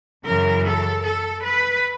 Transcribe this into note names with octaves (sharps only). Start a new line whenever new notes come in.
F#2 C#3 E3 A#4
A4
A4
B4